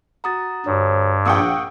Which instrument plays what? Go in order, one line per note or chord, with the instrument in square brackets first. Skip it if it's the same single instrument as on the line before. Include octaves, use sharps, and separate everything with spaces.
[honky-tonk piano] F#4 [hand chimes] A#5 D#6 A6
[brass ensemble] D2 C#5 [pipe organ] G2
[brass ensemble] A#1 [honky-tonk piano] A#3 F#5 G5 [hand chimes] C#6 D#6 E6